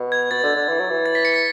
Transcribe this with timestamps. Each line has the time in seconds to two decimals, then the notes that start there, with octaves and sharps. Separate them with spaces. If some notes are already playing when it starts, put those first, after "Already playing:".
Already playing: B2
0.12 G#6
0.31 B2 A6
0.43 D3
0.56 D3
0.68 E3
0.79 F#3
0.90 E3
1.06 A6
1.15 B6
1.25 C#7
1.34 B6